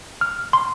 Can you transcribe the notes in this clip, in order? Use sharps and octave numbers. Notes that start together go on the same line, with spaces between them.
F6
C6